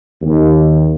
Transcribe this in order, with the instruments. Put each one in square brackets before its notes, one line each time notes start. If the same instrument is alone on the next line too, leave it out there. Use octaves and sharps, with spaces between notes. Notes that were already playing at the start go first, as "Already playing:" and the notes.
[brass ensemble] D#2